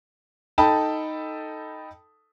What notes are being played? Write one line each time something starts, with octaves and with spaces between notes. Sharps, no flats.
D#4 A4 G5 A5 B5